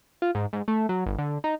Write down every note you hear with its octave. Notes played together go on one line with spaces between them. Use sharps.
F4
G#2
G#2
A3
F#3
G1
D3
D#4